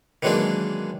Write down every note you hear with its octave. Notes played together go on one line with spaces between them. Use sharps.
D#3 E3 F#3 G#3 A#3 D4